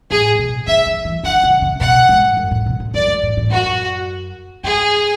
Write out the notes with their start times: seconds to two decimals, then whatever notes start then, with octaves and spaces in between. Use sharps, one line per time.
0.11 A2 G#4
0.39 B2
0.67 D3 E5
0.87 E3
1.05 E3
1.23 D3 F#5
1.44 C#3
1.62 C#3
1.80 B2 F#5
2.09 G#2
2.37 F#2
2.51 A2
2.66 B2
2.80 A2
2.94 F#2 D5
3.08 G#2
3.23 A2
3.37 A2
3.50 F#2 F#4
4.64 G#2 G#4